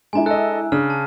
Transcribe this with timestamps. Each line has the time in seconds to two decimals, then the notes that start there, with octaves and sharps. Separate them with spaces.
0.13 G#3 D4 E4 G#5 A#5
0.26 A4 D#5 E6 F#6
0.72 C#3 D4 F6
0.90 A5